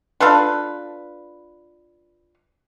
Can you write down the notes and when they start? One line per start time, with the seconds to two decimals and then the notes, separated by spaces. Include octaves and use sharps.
0.20 D4 F4 A4 B4